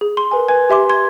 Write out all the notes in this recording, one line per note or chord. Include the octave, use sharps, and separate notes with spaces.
G#4
C6
A#4 B4 G#5
B4 G#5 G#6
G4 E5 C6 D6
C6 G#6